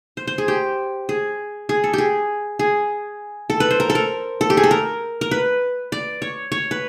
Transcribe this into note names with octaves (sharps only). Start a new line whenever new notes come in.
C5
C5
G#4
G4
G#4
G#4
A4
G4 G#4
G#4
A4
B4
C5
A#4
A4
A#4
A4
G4
G#4
A4
A#4
A#4
B4
D5
C#5
C#5
B4